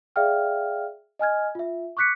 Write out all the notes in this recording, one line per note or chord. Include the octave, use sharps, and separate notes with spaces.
G#4 D5 E5 F5 G5 F6
D#5 G#5 F6 G#6
F4 E5
C#6 D6 F#6 B6 C#7